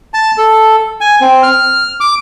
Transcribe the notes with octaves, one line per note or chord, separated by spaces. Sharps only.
A5
A4
G#5
C4
F6
D6